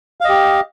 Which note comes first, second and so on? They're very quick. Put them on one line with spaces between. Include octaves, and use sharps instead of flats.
F5 D#5 G4